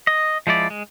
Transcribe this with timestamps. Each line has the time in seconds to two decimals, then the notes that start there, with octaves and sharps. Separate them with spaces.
0.07 D#5
0.47 F3 G#3 E4 D5
0.70 G#3